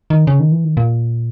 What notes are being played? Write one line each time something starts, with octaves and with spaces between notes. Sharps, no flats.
D#3
C#3
D#3
E3
D#3
A#2